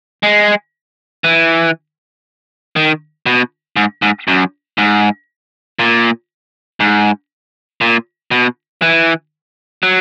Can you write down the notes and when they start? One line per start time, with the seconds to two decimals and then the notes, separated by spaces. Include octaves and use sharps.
0.23 G#3
1.24 E3
2.76 D#3
3.26 B2
3.76 G#2
4.02 G#2
4.28 F#2
4.78 G#2
5.79 A#2
6.80 G#2
7.81 A#2
8.31 B2
8.82 E3
9.83 F#3